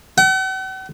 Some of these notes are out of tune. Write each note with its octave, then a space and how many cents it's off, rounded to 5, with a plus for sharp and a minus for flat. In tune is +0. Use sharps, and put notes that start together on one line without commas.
F#5 +45